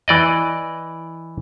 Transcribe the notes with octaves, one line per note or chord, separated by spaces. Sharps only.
E3 D5 D#5